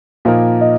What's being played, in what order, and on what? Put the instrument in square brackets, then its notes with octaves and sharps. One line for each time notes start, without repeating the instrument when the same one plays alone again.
[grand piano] A#2 F3 A#3 D#4 A#4 [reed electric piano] F5
[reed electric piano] D#5